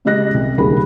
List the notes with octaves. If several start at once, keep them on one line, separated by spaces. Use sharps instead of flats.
C#3 G#3 G4 D#5 F#6 A#6
C2
E1 D#2 C#3 G3 G#4 B5